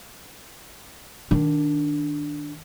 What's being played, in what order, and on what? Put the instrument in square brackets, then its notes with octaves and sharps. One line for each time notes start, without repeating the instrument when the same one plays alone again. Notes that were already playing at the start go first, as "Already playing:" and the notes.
[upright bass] D#3 D4